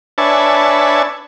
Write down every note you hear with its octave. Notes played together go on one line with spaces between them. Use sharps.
D4 B4 C#5 E5 G#5 A5